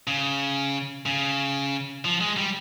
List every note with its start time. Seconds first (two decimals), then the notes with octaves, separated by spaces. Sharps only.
0.07 C#3
1.06 C#3
2.05 F3
2.21 G#3
2.37 G3